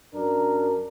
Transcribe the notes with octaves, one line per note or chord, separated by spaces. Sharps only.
F#2 D4 A#4